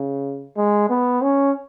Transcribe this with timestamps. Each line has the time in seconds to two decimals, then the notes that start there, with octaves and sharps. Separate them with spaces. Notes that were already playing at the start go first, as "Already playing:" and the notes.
Already playing: C#3
0.57 G#3
0.90 B3
1.22 C#4